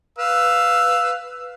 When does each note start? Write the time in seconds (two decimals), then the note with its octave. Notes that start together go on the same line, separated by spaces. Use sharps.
0.19 B4 F5 E6